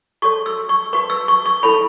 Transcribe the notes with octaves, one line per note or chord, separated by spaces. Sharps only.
F#4 A4 C#5 C#6
E6
C#6
F#4 B4 C#6
E6
C#6
C#6
E4 A4 C#5 B5